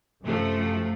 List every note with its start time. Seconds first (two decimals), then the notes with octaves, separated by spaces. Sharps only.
0.23 F#2 C3 F3 A3